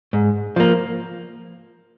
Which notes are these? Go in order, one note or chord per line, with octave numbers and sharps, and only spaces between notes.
G#2
F3 A#3